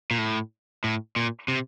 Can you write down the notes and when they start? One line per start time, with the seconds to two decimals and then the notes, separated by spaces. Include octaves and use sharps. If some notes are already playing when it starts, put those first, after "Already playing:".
0.11 A#2
0.18 A2
0.84 A2
1.16 A#2
1.48 C3